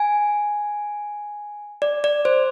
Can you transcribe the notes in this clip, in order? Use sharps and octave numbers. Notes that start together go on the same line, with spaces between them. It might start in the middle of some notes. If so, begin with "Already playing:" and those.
Already playing: G#5
D5
D5
C5